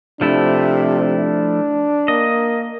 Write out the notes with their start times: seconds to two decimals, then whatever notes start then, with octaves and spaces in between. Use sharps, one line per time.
0.21 C3 F3 A3 D4 E4
2.08 A#3 D#5